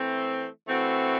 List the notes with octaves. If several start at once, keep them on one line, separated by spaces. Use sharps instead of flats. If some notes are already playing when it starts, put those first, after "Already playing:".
Already playing: E3 A3 C4
E3 A3 C4 F#4